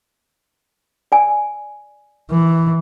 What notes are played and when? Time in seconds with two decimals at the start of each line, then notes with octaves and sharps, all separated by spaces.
1.12 D5 G#5
2.30 E3